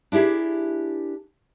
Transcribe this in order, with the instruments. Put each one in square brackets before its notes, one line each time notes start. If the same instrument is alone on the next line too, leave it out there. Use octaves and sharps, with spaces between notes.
[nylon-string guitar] D4 E4 G4 G#4 A#4